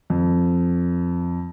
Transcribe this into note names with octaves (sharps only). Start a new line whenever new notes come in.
F2